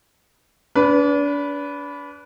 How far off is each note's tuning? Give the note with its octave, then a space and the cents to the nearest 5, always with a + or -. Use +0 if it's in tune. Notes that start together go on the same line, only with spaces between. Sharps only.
D4 -35 B4 +0